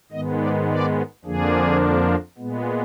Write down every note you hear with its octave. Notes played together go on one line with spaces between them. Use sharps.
G#2 D#3 G#3 B3 D#5
D5
D5
F2 D3 F3 A#3 D4 G#4
A#2 G#3 B3